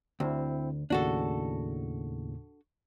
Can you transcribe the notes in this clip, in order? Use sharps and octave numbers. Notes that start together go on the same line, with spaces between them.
D2 C4 E4
D#2 A2 C#3 D4 F#4 A4